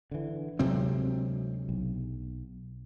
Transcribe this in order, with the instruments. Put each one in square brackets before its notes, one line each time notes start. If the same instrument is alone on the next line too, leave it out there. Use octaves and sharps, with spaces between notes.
[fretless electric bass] D3 E3
[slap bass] D2 C3 C4 [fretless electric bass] F#3 G#3
[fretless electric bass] B1